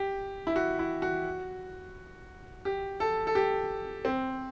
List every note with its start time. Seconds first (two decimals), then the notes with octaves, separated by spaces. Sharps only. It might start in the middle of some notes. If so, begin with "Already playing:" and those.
Already playing: G4
0.47 E4
0.56 F#4
0.79 E4
1.02 F#4
2.65 G4
3.00 A4
3.27 A4
3.35 G4
4.05 C4